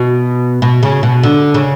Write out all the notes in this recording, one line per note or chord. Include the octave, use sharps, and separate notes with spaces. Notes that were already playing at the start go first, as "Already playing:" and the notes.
Already playing: B2
B2
C#3
B2
D3
C#3